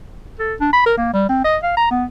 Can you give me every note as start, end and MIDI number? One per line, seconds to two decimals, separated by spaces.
0.39 0.55 69
0.60 0.68 62
0.73 0.82 83
0.86 0.93 70
0.97 1.09 58
1.13 1.26 55
1.29 1.42 60
1.44 1.57 75
1.63 1.77 77
1.77 1.87 82
1.91 2.05 59